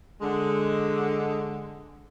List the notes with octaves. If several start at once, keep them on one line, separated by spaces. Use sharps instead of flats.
D3 G#3